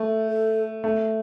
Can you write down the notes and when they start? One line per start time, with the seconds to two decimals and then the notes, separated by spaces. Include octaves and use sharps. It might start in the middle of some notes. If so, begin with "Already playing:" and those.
Already playing: A3
0.28 A4
0.84 A3